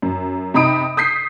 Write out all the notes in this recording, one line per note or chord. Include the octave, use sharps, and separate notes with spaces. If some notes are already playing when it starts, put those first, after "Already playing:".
F#2
C3 D#4 B5 D#6 D7
D#6 G6 B6 C7